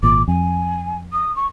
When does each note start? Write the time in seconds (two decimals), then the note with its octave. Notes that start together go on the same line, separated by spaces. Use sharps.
0.03 G#1 A#2 D6
0.28 F2 G#5
1.12 D#6
1.36 C#6